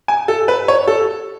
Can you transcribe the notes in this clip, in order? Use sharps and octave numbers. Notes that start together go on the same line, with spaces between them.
G#5
A4
B4
C#5
A4